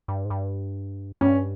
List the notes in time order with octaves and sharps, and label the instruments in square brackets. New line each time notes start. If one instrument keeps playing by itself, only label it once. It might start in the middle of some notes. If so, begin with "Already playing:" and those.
[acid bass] G2
G#2
G2
[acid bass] G2 [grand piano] C#4